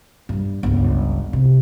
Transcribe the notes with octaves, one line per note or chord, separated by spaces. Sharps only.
G2 G3
G1 C#2
C3